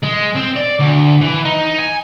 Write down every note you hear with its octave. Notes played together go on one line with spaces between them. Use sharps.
G#3
C4
D5
D2
E3
D#4
G#5